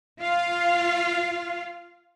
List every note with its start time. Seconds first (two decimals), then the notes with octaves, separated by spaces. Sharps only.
0.21 F4 F5